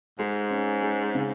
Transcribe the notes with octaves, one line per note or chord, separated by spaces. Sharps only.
G#2 G#3
C#4
G#3
C#3